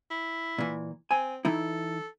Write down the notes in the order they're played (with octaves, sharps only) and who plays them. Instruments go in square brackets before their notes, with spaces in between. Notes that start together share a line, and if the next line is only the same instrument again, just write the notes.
[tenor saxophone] E4
[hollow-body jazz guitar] A#2 E3
[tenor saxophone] C4 [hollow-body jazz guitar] G#5
[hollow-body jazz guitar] E3 D#4 E4 [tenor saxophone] A4